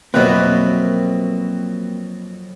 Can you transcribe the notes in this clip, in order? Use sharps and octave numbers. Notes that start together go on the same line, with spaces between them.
F2 B2 F#3 A#3 C4 B4 E5 F#6